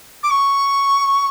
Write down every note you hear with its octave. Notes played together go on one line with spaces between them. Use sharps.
D6
C#6